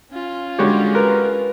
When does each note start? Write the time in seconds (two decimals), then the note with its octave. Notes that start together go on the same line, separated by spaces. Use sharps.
0.11 C#4 F4
0.58 D3 G3 G#3 F#4 G4 C#5
0.95 A#4 B4